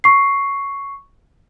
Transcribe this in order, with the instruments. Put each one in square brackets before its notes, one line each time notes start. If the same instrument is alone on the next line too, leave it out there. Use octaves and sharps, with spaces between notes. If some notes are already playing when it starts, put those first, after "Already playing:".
[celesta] C#6 C7